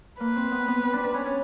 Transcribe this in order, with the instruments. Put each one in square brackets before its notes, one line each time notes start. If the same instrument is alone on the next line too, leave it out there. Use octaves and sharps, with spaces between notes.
[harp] A#3 [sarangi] B4
[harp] C4
B3
B3
C4
D4
D4
C#4
C#4